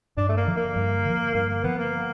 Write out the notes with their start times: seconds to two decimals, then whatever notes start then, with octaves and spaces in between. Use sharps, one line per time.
0.17 G2 D4
0.29 A3
0.37 A#3
0.47 D3 F3
0.57 A#3
0.76 G2
1.05 D3 F3
1.34 G2 A#3
1.49 A#3
1.63 D3 F3 B3
1.79 A#3